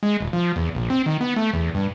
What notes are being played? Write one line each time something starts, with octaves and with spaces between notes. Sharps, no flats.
G#3
D#1
F3
E2
A#1
C4
D#3
B3
A3
E2
G2